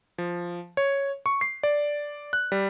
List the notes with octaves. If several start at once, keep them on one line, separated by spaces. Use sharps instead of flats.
F3
C#5
C#6
C7
D5
F#6
G3